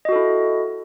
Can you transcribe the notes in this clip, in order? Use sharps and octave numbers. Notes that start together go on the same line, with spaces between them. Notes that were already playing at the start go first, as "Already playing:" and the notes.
E4 F#4 A4 D#5